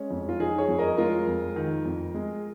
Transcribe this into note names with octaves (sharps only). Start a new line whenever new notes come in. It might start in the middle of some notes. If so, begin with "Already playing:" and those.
Already playing: G#3 C#4
F2
F4
F3 D#4 G#4
G#4 C#5
F2
A#4 D#5
G#3 F4 A#4
F2
D#3
F2
G#3